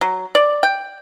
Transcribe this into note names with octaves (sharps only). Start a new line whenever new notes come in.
F#3
D5
G5